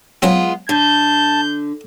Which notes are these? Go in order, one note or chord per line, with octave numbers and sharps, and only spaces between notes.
F#3 G#3 B3 C4 F4 G#4
D3 A5 G6